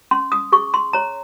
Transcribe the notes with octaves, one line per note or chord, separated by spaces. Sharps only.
C#4 C6
D#6
G#4 C#6
C6
C#5 A#5